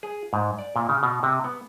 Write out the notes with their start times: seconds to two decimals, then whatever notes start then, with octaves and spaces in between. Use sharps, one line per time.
0.03 G#4
0.33 G#2
0.59 D5
0.76 A#2
0.89 C#3
1.03 B2
1.23 C3
1.44 B3